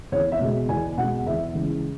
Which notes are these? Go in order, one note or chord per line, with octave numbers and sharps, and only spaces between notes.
E2 C#5
E5
B2 G#3
E2 G#5
B2 G#3 F#5
E2 E5
C#3 E3 G#3